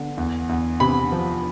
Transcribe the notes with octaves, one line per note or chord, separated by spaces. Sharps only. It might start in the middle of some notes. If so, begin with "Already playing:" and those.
Already playing: D3 B3
E2
E2
C3 B5
F3